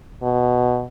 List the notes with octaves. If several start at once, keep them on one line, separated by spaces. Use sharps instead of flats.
B2